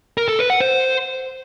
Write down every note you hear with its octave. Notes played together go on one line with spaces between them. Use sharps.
A#4
A4
B4
F#5
C5